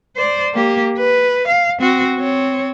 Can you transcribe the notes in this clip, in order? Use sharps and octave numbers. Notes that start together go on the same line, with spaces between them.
C5 D5
A#3 G4
B4
F5
C4 F#4
C4 C#5